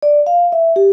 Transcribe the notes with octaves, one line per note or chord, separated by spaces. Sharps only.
D5
F5
E5
G4